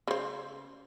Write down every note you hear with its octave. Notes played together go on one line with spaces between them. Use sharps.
C#3 C5